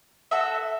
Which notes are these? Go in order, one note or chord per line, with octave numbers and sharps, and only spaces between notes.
F#4 A4 E5